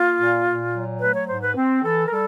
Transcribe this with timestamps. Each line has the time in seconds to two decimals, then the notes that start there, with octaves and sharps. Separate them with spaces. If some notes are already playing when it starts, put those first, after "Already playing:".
Already playing: A#3 F4
0.19 A#2
0.46 A#2
0.73 F#3
1.01 A3 B4
1.15 C#5
1.28 G#2 C5
1.42 B4
1.56 C4
1.84 E3 A4
2.07 A#4
2.11 G3 A4